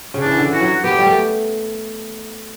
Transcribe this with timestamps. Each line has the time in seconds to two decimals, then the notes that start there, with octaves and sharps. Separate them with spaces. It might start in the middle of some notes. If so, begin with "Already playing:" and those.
0.14 C#3
0.21 E3 D4
0.38 D3
0.51 E3 F#4
0.61 F#3
0.84 B3 G4
0.91 A3
0.99 G3
1.06 A3